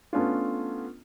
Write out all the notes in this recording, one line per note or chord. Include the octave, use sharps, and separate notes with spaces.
A3 B3 C#4 D4 F4